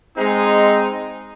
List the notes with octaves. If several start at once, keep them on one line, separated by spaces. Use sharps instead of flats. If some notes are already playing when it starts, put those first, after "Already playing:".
G#3 C4 D#4